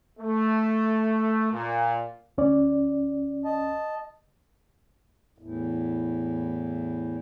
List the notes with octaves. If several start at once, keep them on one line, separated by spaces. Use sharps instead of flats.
A3
A#2
D2 C#4 D5
D#5 A5
E2 A2